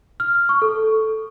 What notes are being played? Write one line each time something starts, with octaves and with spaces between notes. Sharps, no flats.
F6
C#6
A4